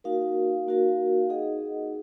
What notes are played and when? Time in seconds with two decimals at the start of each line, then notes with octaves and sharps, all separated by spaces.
0.04 A#3 D#4 F#4 A#4 F5
0.67 A#3 D#4 F#4 A#4 F5
1.30 D#4 G#4 D#5 F#5